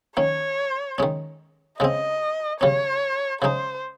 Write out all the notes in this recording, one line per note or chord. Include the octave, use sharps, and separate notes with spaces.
D#3 A#3 C#4 C#5
D#3 G#3 C#4
C#3 G#3 C4 D#5
C#3 G3 C#4 C#5
C#3 G#3 D#4 C5